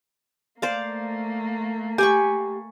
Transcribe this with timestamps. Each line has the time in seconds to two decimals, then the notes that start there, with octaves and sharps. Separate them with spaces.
0.62 A3 A#3 C5 D5 F5
1.98 G4 G#5 B5 C#6